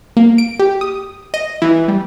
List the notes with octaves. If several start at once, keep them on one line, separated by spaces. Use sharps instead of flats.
A#3
D7
G4
D#6
D#5
E3
G3